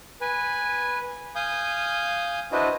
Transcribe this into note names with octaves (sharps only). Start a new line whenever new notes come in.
B4 G#5
F5 G#5 D#6 G6
D4 E4 F#4 B4 C5 D#5